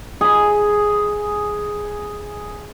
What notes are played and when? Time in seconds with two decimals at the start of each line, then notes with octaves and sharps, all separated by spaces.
0.21 G#4 B5